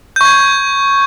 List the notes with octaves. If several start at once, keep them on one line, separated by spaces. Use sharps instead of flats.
C#6 G6 G#6